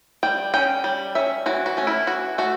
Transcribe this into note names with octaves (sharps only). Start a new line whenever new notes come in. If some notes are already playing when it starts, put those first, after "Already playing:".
G3 G5
C#4 G5
G3
C#4 E5
E3 F#4
F#4
A3 C#4
E4
E3 F#4
A3 F#4